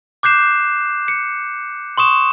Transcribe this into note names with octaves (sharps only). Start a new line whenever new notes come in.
D6 F#6 G6 C7 E7
C#7
C6 C#6 D#6 E7